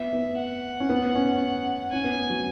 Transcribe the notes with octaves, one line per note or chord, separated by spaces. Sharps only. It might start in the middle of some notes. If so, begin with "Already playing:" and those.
Already playing: B3 E5
B3
F#5
C#4
B3
C#4
C#4 G#5
B3
F#3